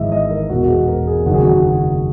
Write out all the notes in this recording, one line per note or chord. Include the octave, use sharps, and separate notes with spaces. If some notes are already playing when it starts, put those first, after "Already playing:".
Already playing: G#1 G#2 E3 D#5 E5
D#5
A#4
E1 E2 B2 F#4
F#4
G#4
A#4
G#4
F#1 F#2 D#3 F#3 F#4
G#4
F#4